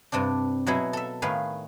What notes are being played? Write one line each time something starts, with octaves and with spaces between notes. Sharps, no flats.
G2 C3 C4 D4
B2 F#3 E4 G#4
A4 E5
A2 D#3 G#4 B4 F5